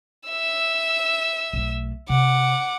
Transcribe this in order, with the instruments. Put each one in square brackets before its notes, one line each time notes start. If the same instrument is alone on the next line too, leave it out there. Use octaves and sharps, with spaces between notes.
[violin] E5 E6
[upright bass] B1 A3
[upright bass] C3 [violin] F#5 D6